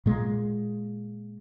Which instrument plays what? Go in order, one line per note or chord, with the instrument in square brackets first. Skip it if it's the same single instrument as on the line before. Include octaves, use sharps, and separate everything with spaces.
[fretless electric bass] A#2 G#3